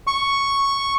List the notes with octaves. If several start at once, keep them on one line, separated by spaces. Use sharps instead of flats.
C#6